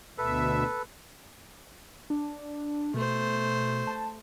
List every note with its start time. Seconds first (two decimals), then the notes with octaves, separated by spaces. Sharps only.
0.18 D2 B2 A4 B4 E5
2.10 D4
2.94 B2 A3 C5
3.87 A5